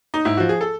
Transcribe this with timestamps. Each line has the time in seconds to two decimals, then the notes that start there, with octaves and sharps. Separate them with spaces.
0.14 D#4
0.25 G#2 E4
0.37 F3 F#4
0.49 G#4
0.61 A4